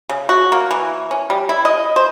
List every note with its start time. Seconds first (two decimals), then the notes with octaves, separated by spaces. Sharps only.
0.09 C#3
0.29 F#4
0.52 A#3
0.71 E3
1.11 C#4
1.30 G3
1.49 E4
1.65 D#5
1.96 C5